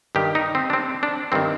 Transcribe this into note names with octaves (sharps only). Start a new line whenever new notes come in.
G2 D#3 G4
D#4
C4
D4
C4
D4
G2 D#3 C4